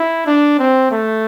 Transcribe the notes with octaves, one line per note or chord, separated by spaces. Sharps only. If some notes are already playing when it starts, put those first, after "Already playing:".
Already playing: E4
D4
C4
A3